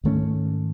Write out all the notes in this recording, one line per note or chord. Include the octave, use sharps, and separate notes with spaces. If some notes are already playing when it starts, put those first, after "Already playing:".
G#2 D#3 A3 C#4